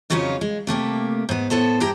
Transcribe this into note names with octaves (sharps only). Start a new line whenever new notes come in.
F2 C#3 F#3 C#4 D#4 F4
G#3
C3 A3 A#3 G4
G#2 B3
A2 B3 A4 C5
G2 E4 G4 G5 A#5